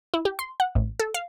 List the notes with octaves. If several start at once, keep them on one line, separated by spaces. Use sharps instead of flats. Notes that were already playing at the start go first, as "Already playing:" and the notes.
E4
G4
C6
F#5
A1
A4
F5